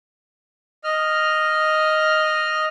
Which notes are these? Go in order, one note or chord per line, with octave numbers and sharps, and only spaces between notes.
D#5 F6